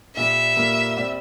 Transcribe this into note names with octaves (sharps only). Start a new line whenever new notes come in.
A#2 G3 A#3 E5
A#2 G3 A#3
G3 C4 G4 D5